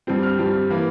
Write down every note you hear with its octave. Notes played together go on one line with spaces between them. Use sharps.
G2 G3 C4
F6
G2 G3 C4
E3 A#3